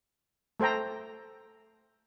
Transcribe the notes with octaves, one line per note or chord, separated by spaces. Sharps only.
A3 A4 C5 G5 A#5